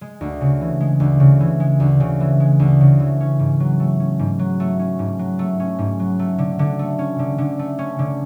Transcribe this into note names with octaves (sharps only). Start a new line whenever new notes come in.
G#3
D2
C#3
E3
G#3
D2
C#3
E3
G#3
D2
C#3
E3
G#3
D2
C#3
E3
C#4
G#2
F#3
A3
C#4
G#2
F#3
A3
C#4
G#2
F#3
A3
C#4
G#2
F#3
A3
D3
D3
A3
C#4
D3
D3
A3
C#4
D3